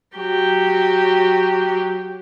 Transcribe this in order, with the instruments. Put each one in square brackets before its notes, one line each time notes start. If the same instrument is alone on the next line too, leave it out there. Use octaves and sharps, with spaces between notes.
[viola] F#3 G4